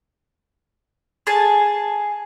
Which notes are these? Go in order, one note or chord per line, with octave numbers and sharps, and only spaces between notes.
G#4 A5